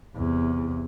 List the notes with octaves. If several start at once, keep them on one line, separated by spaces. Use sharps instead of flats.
E2 C3